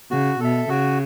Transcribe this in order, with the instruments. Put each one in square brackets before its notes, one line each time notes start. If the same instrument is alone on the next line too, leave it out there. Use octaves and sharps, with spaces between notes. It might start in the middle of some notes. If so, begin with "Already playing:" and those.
[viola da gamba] C#3 [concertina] F#4
[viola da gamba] B2 [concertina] A4 E5
[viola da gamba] C#3 [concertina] F#4